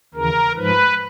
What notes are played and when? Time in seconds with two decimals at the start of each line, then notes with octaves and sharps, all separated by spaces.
0.14 D#2 C#3 E3 A#4
0.56 G#2 F3 B4